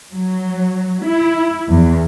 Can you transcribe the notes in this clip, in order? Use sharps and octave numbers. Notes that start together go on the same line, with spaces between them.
F#3
E4
E2